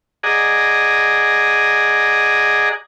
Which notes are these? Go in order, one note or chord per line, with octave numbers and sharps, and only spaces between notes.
G#4 D5 D#5 F#5 G#5 A#5